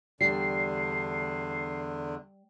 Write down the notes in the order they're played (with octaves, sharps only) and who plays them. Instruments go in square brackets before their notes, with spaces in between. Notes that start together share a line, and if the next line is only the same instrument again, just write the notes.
[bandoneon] E2 D3 D4 [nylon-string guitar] G3 [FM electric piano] C7